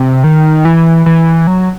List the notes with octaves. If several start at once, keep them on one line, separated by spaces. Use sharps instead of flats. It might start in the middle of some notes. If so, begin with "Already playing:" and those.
Already playing: C3
D#3
E3
E3
F#3